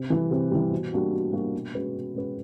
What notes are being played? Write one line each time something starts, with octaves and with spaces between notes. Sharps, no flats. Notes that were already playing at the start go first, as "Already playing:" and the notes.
Already playing: C3
E3 G3
C3
E3 G3
B2
G3 A#3 D4 F#4
B2
G3 A#3 D4 F#4
B2
G#3 C#4 F#4 B4
B2
G#3 C#4 F#4 B4